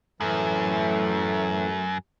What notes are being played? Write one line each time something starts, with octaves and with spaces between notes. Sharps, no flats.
F#2 A2 E3 A3